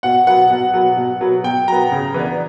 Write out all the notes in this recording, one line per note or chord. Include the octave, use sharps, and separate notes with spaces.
B2 F#5
F#3 B3 F#5
B2
F#3 B3
B2
F#3 B3
B2 G5
F#3 B3 A#5
C#3
E3 B3 D4